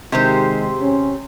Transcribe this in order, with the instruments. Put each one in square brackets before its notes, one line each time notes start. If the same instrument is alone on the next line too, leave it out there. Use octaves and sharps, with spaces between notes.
[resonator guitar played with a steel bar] C3 G4 C5 [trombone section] D#3 G#3
[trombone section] C#4